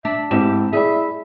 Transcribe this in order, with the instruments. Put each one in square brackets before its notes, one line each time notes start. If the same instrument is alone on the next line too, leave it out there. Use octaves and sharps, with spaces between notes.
[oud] D4 [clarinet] E5
[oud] G#2 [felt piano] C4 E4 E7 [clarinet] G4
[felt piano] E4 D5 B5 [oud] G#4 [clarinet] E5